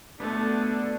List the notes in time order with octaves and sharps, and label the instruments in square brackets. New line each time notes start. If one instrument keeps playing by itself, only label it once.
[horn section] B2 D3 [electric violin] A3 [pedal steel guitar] B3 A5 [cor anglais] D4